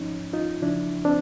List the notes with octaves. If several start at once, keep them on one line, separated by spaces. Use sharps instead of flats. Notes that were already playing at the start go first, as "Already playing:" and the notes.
Already playing: G#2 F3 C#4 D#4
D#4 F4
E2 C#3 F3 D4 E4
C4 D4